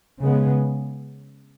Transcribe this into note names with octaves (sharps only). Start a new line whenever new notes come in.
C#3 G#3 B3